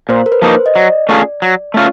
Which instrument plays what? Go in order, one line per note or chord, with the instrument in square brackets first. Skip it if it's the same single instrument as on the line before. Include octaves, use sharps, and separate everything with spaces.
[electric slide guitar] A#2 [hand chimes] C5
[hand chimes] A#4
B4
[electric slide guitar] F3 A#3 D#4
[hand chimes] C5
D#5
[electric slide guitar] F#3 [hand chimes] D5
[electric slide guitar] A3 C#4 F4 G#4
F#3
A3 C#4 F4